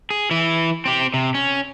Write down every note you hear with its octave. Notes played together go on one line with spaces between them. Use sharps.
G#4
E3 E4
C4 G4
C3
C#4